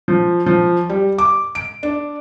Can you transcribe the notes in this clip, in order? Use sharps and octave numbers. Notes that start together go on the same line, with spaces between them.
F3
F3
G3
D6
D7
D4